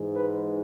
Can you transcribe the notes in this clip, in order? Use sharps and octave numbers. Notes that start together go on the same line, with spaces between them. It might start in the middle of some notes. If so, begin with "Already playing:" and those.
Already playing: G#2 E3 G#3
B4